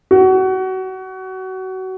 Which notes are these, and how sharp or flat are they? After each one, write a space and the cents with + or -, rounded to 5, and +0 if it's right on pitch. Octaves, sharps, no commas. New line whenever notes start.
F#4 +25